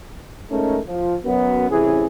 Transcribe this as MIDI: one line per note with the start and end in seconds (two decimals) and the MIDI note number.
0.51 0.79 56
0.51 0.79 57
0.51 0.79 61
0.51 0.79 63
0.51 0.79 69
0.51 0.79 70
0.88 1.16 53
1.25 1.69 42
1.25 1.69 59
1.70 2.06 33
1.70 2.06 48
1.70 2.06 52
1.70 2.06 61
1.70 2.06 68